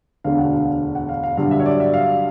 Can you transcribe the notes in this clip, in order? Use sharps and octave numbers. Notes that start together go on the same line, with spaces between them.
E1 D2 D3 F5
F#5
F5
F#5
F5
F5
G2 D3 F#3 F5
E5
C#5
D5
E5
F5